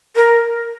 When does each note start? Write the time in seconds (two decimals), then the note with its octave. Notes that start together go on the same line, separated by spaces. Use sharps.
0.16 A#4